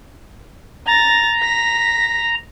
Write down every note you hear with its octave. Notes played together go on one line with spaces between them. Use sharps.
A#5 A6 A#6
A#6 B6